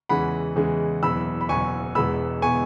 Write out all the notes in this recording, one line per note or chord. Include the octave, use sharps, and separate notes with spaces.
E2 C#3 E3 G#3 F#5 B5
E2 C#3 E3 G#3
F#1 E2 B2 B5 E6
B5
F#1 E2 B2 G#5 C#6
E1 E2 B2 G#3 B3 B5 E6
B2 G#3 B3 G#5 C#6